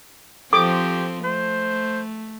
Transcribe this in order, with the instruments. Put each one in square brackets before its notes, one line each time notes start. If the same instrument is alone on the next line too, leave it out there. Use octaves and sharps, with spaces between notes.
[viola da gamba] F3 C4 [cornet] G4 [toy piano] A4 C#6 [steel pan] D6
[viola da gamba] A3 [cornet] C5